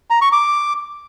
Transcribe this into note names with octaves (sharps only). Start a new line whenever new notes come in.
A#5
C#6
D6